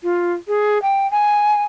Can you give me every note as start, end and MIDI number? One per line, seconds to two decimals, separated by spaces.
0.03 0.33 65
0.48 0.81 68
0.82 1.10 79
1.11 1.63 80